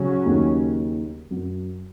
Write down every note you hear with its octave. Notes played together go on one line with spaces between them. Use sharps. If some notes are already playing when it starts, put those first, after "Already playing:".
Already playing: C#3 F#3 C#4
D#2 D#3
F#2 F#3